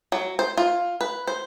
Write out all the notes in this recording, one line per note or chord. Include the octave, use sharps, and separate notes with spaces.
F#3
C5
F4
B4
C5